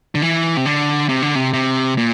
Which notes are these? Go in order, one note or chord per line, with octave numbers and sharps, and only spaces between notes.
D3
E3
C3
D3
C3
D3
C3
C3
A#2